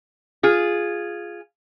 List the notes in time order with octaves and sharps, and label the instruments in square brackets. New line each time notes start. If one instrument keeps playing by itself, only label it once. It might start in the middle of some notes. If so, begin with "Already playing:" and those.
[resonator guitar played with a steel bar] F4 G#4